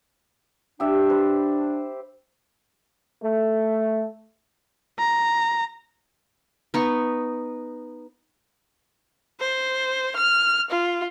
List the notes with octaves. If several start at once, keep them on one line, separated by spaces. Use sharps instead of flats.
D4 G4 E5
C5 B5
A3
A#5
B3 D#4 C#6
C5
F6
F4